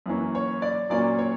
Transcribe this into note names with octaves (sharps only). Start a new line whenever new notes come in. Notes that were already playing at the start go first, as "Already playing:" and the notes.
F#2 E3 A#3 C#4
C#5
D5
A#2 F#3 A#3 C#4 D5
C#5